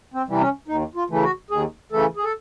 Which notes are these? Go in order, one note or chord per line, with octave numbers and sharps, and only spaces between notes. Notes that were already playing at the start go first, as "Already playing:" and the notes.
C4
C3 E3 G3
C#4
D#2 D#4
F4
C#3 E3 A3
F#4
D#2 G#4
C#3 E3 A3 A4
G#4
A4